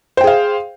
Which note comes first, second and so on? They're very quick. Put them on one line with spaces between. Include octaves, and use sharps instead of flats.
C5 G5 G#4 F5